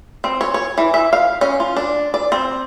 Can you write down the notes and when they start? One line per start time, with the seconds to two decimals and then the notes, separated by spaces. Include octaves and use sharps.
0.24 C4
0.41 C#5
0.54 C#5
0.78 E3
0.94 E5
1.13 F5
1.41 C#4
1.60 F4
1.77 D4
2.14 D5
2.32 C4